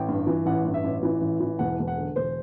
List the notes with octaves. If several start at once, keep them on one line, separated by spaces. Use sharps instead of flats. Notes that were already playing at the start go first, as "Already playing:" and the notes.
Already playing: A1 G5
G2
E3
A1 F#5
G2
E5
A1
E3
A1
E3
E1 F#5
E1
F#5
D3
E1 C5